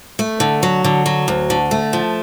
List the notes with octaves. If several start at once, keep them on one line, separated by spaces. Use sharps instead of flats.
A3
D3
F#3
D3
F#3
D2
D3
A3
F3